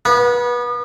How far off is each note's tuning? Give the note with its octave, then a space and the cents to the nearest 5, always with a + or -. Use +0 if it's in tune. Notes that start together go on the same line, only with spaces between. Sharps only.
B3 -30